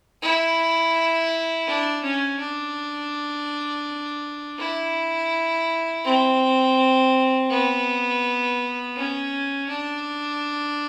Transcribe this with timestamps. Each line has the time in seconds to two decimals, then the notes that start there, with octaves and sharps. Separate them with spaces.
0.22 E4
1.67 D4
2.04 C#4
2.40 D4
4.59 E4
6.04 C4
7.51 B3
8.96 C#4
9.69 D4